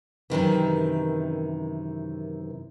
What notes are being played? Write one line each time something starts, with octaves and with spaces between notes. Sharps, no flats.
F#2 C3 D#3 E3